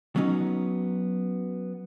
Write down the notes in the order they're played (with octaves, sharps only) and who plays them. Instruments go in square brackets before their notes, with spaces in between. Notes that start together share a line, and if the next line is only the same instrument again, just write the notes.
[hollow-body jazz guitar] F#3 B3 C#4 D#4